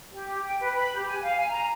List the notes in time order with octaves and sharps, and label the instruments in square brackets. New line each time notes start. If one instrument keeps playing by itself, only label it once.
[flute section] G4
G5
B4
B5
G4
G#5
F5
G#5
A#5